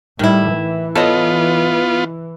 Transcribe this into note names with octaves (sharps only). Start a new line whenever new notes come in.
A2 D#3 G3 E4
E3
B3 F4 A4 C#5 D#5